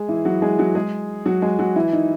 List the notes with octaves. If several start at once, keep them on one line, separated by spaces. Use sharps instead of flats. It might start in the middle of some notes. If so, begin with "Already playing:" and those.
Already playing: G#3 G#4
E3 E4
F#3 F#4
G#3 G#4
F#3 F#4
G#3 G#4
F#3 F#4
G#3 G#4
F#3 F#4
E3 E4
D#3 D#4